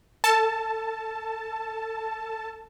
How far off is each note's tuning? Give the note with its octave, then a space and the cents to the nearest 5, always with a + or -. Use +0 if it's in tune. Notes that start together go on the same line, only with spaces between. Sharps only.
A4 +25 A5 +0